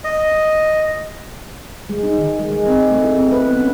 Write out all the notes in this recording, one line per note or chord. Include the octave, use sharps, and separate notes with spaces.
D#5
G#3
D#4
D#3
G#3
G#3
C4
A3
E4
C4
B4
B3
C#4